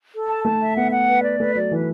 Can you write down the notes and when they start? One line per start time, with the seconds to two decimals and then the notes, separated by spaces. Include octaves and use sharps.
0.14 A4
0.29 A5
0.44 A3 A5
0.61 E5
0.76 B3 F#5
0.92 F#5
1.08 B4
1.23 D5
1.40 A3 B4
1.55 F#3 D5
1.71 E3 B4